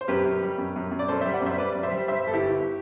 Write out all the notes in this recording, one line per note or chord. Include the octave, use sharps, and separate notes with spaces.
C5
F#2 G4 B4
F#2
G3
F#2
F#2
F#2
D5
F#2 A4 C5
C5 E5
G3
D5 F#5
F#2 C5 E5
G3 B4 D5
F#2
C5 E5
G3
G2 C5 E5
G1 A4
E4 G4
G1